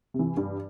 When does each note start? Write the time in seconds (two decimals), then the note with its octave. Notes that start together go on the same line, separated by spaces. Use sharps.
0.14 C3
0.19 E3
0.37 G2